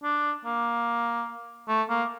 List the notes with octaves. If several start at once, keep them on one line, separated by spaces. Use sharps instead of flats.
D4
A#3
A3
A#3